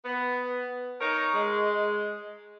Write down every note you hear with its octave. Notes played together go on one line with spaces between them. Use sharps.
B3
D#4 A#4 C#5
G#3